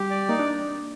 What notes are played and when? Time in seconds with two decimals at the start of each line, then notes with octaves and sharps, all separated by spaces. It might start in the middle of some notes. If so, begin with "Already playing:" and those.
Already playing: G3 G4
0.10 D5
0.29 A#3 D#4
0.39 D4